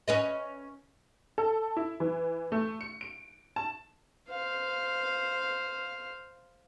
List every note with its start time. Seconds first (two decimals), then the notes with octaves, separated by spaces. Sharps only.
0.08 C#4 B4 D#5
1.38 A4
1.77 E4
2.00 E3
2.52 A3
2.81 C#7
3.01 D7
3.56 A5
4.30 C5 F5